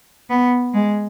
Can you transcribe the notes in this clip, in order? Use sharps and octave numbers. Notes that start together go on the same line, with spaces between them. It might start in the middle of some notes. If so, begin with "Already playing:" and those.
B3
G#3